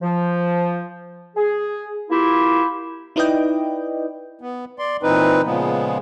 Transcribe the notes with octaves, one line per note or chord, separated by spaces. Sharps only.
F3
G#4
A#3 E4 F4 G4
D#4 E4 B4 D5 D#5 G5
B3
D5 C6
A#2 E3 C4 D#4 B4
A#2 C#3 F3 G#3 B3